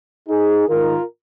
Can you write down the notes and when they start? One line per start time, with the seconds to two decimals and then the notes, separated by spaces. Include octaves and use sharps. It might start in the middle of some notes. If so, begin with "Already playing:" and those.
0.29 D#4 G#4
0.68 G#2 D#3 F4 A#4